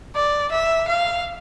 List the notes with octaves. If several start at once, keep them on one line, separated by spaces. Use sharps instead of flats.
D5
E5
F5